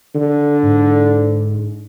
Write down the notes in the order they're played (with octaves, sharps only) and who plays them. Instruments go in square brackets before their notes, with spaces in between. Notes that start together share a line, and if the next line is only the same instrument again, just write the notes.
[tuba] D3
[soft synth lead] G#2